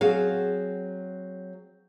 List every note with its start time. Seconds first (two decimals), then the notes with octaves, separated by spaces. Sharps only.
0.01 F#3 C4 G#4 F5